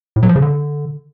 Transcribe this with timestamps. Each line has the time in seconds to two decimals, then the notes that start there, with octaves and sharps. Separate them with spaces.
0.16 A2
0.23 F#3
0.29 F3
0.36 C#3
0.42 D3